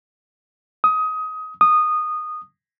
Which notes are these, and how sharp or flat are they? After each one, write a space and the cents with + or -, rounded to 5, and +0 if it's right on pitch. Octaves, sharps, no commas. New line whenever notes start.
D#6 +20
D#6 -15